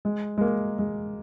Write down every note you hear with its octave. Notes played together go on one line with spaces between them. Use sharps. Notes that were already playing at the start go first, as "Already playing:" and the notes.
G#3
G#3
A#3
G#3